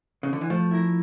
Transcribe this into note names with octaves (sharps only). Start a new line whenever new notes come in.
C#3
D3
E3
F3 A3
E4 A#4